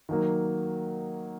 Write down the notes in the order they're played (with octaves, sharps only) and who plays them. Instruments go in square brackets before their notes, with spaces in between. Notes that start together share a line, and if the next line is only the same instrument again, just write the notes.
[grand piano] D#3 F#3 A#3